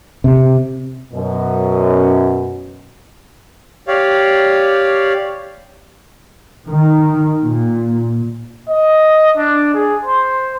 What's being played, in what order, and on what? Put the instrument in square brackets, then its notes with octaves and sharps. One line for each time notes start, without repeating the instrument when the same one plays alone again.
[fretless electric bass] C3
[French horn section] F#2 B2
[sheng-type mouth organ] G4 C#5 D5 F5
[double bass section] D#3
A#2
[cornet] D#5
D4
G#4
C5